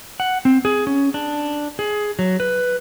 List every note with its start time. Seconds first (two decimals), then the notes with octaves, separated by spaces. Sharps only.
0.20 F#5
0.45 C4
0.65 G#4
0.87 C#4
1.14 D4
1.79 G#4
2.19 F#3
2.40 B4